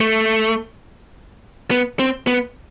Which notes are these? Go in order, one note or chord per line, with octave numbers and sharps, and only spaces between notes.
A3
B3
C4
B3